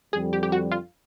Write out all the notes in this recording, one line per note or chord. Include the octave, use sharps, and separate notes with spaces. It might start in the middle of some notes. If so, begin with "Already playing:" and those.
F2 D3 G3 G#4
G4
G4
F#4
F4